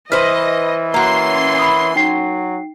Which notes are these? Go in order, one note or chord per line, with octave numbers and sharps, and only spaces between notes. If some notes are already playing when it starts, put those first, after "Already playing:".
E3 B4 C5 D#5 F6
A#3 C#4 F#4 C6
B5 D#6
F#3 D#4 G5 C7